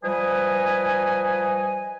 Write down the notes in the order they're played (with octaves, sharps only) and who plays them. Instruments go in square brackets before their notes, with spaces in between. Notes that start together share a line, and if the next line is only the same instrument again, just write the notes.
[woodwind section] F3 G3 B4 D#5 G#5